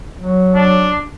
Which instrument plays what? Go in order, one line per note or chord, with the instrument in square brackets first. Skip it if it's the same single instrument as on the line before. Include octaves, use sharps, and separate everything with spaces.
[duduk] F#3
[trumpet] D4